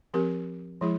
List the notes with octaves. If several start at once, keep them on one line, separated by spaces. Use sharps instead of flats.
F3 C4 G4 A#4
F3 G#3 E4 G#4